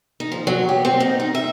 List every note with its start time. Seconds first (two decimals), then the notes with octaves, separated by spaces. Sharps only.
0.20 D#4
0.32 F3
0.47 F#3
0.69 G4
0.85 C4
1.00 D#4
1.20 D#4
1.35 E5